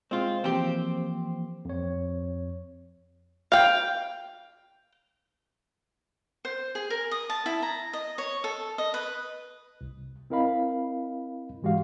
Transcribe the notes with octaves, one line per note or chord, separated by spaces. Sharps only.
G#3 C4 F4 G#4 F5
E3 F3 A#3 C4 G4
F2 C#5
F5 G5
C5
G#4
A#4
D#6
A5
E4
A#5
D#5
C#5
A4
D#5
B4
C2
C4 E4 A#4 D#5 F5 B5
G#2 E3 G#3 F#4 G4 F5